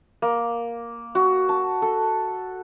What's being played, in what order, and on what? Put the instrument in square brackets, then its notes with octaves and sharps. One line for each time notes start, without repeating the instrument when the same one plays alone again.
[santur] A#3
F#4
A5
A4